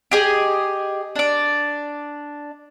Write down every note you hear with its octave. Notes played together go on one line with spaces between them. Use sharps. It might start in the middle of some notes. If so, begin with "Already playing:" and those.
G4 G#4 D#5
D4 D5